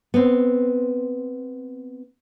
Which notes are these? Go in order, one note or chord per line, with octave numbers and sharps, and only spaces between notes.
B3 C4